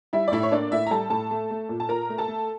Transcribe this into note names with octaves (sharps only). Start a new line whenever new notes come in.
G3 E4 E5
D5
A2 E4 E5
C#5
A#3 D4 D5
A2 E4 E5
A#5
G3 A4 A5
A2 A4 A5
A3
A3
A#2
A5
A#2 A#4 A#5
A3
A4 A5
A3